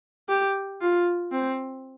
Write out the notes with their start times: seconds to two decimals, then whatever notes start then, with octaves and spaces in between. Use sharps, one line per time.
0.29 G4
0.81 F4
1.32 C4